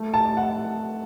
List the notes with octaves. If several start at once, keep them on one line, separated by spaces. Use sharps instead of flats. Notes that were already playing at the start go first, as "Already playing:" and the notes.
Already playing: A3
A5
F#5